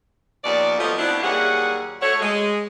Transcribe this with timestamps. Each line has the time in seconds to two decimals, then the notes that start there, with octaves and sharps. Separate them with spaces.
0.44 D#2 F3 B3 C#5 D5
0.78 F3 F#3 A3 B3 F4 D#5
0.98 B2 B3 C4 D4 E4
1.22 D#2 F#3 G3 F#4 G#4 F#5
2.01 A3 F#4 C#5
2.21 G#3